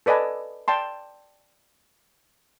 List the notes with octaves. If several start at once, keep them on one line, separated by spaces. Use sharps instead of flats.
A4 B4 D5 D#5 G#5 A5
D5 G5 A5 C6